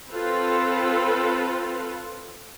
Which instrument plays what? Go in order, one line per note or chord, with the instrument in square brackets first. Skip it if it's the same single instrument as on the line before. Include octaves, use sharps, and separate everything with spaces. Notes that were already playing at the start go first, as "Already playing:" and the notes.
[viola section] C4 F4 A4 B4